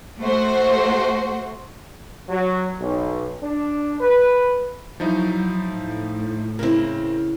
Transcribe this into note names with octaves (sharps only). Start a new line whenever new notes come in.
A3 F#4 C5
F#3
B1
D4
B4
F3 F#3 D#4 E4
A2
C#3 C4 E4 A#4